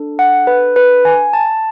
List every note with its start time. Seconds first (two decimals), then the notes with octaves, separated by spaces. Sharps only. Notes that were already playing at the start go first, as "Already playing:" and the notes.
Already playing: D4 A4
0.19 F#5
0.47 B4
0.76 B4
1.05 G#5
1.33 A5